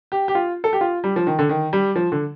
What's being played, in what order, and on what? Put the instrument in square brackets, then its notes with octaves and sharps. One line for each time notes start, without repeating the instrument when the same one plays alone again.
[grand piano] G4
G4
F4
A4
G4
F4
G3
F3
D#3
D3
D#3
G3
F3
D3